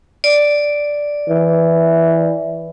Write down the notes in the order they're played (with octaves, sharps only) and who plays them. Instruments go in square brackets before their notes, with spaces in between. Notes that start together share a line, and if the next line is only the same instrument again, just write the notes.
[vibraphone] D5
[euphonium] E3